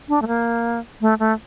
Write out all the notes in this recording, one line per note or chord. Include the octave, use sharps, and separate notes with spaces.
D4
A3
A#3
A3
A3